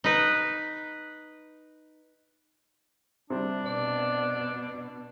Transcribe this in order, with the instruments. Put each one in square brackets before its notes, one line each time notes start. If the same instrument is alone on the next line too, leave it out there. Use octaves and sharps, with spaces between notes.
[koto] D#4 B4
[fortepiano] C3 G3 [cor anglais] D4
[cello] B2 [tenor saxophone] D5